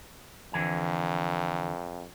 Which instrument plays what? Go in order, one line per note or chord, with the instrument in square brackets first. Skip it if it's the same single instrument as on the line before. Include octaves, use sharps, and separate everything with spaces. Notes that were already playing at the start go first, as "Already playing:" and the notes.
[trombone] F2 [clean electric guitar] D3 E3 G#5